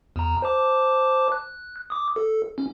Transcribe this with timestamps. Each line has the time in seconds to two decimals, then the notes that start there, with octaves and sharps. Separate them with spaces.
0.16 E2 A#5
0.42 C5 A5 D6
1.32 F#6
1.90 D6 D#6
2.16 A4
2.58 C#4